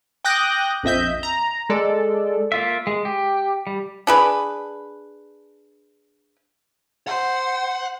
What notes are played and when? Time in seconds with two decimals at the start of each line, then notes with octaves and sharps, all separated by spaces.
0.25 G5 D6 D#6 F#6 G6 A#6
0.83 A#1 F2 D#5 E5 G6
1.23 A#5
1.70 G#3 A4 D5
2.52 A#3 F4 E5
2.87 G#3
3.05 G4
3.67 G3
4.07 D4 G#4 B4
7.07 C5 F#5